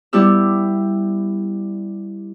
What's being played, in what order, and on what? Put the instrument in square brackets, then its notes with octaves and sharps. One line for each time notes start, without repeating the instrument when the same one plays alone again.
[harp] G3 B3 E4 G4 E6